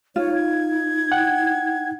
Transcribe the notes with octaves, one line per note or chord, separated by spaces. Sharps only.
D#4 F4 C#5
G#6
F#5 G5